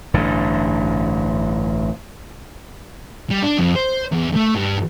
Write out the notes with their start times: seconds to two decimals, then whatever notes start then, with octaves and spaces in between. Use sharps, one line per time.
0.14 A1 G2 D3
3.31 G3
3.44 D4
3.59 F2
3.76 C5
4.12 E2
4.36 A3
4.55 G2